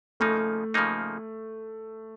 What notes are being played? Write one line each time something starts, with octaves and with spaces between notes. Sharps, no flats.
C#3 F3 A3 A#3 D#4
C#3 F3 A#3 D#4